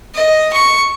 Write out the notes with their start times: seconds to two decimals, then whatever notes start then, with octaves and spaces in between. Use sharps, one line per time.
0.15 D#5
0.53 C#6